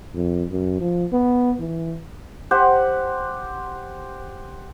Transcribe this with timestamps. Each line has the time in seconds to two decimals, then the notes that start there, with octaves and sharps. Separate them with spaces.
0.15 F2
0.51 F#2
0.81 F3
1.13 B3
1.60 E3
2.51 G4 C5 F#5